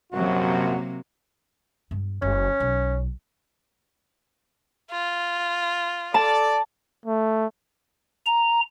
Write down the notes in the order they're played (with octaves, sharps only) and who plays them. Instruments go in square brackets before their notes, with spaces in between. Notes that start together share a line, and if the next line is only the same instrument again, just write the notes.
[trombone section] A#1 F#2 F#4 [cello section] C3 F#3 A#3
[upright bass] G2 B3
[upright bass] F#1 [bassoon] C#4
[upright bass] B1
[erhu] F4
[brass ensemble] A4 D5 [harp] A5
[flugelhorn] A3
[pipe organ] A#5